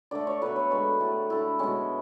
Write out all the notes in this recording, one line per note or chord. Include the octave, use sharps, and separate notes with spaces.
D3 A3 D5
C#5
B2 F#3 A3 B4
C#5
D3 G#3 B4
A2 F#3 A3
D3 A3 E4
B2 G#3 C#4